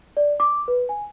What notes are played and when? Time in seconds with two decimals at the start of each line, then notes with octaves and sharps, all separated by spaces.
0.17 D5
0.40 D6
0.68 B4
0.89 G#5